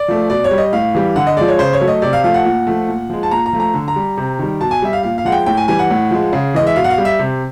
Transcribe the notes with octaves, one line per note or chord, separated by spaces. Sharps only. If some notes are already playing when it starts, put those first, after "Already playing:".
Already playing: D5
F3 A3
B2 D5
C#5
G3
D#5
A2 F5
E3 G3
D3 F#5
D#5
F3 G#3 D5
C#5
C#3 C5
C#5
F#3 A3
D#5
C3 D5
F5
F3 A3 F5
F#5
A#2
F3 A3
A#2
F3 G#3
A5
A#2 A#5
A#5
F3 A3
A#5
D3
A#5
G3
C3
D#3 G3
B2 A5
G#5
G3 E5
F5
A#2 F5
F5
F3 G#3 F#5
G5
A2 G5
G#5
E3 G3 G#5
F#5
A2
F3 G#3
C#3
E3 G#3 D#5
E5
B2 F5
F#5
F5
G3
E5
C3